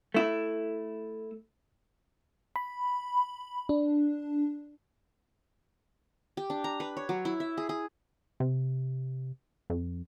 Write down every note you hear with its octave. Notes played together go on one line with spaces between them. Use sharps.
A3 E4
B5
D4
G4
D4
A#5
B4
C#5
F#3
E4
E5
G#4
G#4
C3
F2